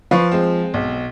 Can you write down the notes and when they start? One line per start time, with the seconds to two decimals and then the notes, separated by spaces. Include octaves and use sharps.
0.11 F3 B4 F5 C#6
0.31 G#3 C4
0.74 B1